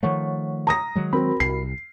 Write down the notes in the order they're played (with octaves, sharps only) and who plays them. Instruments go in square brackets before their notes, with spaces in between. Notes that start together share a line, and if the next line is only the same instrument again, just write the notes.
[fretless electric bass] D#3 F3 A3 [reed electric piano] C#5 F#5 C#6
[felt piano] A#5 D#6 A#6
[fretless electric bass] D#3 F#3 G#3
[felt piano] C4 [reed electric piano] F#4 A#4 B5
[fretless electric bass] C2 [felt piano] C7